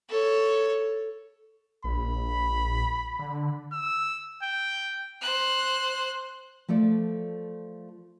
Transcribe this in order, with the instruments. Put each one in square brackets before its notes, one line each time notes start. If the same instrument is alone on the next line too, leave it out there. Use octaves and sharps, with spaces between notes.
[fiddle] A4 C#5
[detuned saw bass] A#1 [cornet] B5
[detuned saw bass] D3
[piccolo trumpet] E6
G5
[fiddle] C5 F#6
[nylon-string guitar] F3 A3 A4 D5